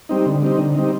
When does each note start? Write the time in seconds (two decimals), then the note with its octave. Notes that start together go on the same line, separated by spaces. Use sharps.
0.09 G3 C4 D#4
0.26 D3
0.42 G3 C4 D#4
0.58 D3
0.75 G3 C4 D#4